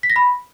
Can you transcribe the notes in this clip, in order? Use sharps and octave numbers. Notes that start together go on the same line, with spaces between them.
B6
A#6
B5